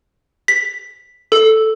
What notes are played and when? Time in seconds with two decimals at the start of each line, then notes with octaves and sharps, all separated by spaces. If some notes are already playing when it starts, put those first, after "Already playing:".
0.48 B6
1.32 A4